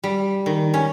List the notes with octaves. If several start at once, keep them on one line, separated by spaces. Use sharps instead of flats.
G3
D#3
C#4